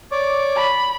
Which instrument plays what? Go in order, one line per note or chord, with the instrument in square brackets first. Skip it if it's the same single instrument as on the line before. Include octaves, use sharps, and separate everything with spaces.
[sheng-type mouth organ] C#5 D5 D6
[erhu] B5